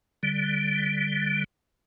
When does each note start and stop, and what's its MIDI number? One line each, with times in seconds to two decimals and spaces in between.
0.23 1.44 50
0.23 1.44 55